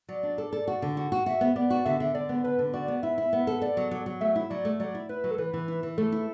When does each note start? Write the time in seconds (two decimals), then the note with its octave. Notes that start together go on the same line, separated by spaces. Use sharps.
0.09 F#3 D5
0.23 D4
0.38 A4
0.53 A4
0.67 F#4
0.82 D3
0.97 F#4
1.12 F#4
1.26 F#4 E5
1.41 B3
1.56 B3 D5
1.70 F#4
1.85 D3 E5
2.00 D3
2.14 D3 D5
2.29 B3
2.44 D3 B4
2.59 D3
2.74 F#4 D5
2.88 B3
3.03 E4 E5
3.18 E4
3.33 B3
3.47 A4
3.62 A4 D5
3.77 F#3
3.91 F#3
4.06 F#3
4.21 A3 E5
4.36 E4
4.50 F#3 D5
4.65 A3
4.80 F#3 D5
4.95 E4
5.09 E4 B4
5.24 F#3
5.31 A4
5.38 E3 B4
5.54 E3
5.68 E4
5.83 E3
5.98 A3 A4
6.12 E4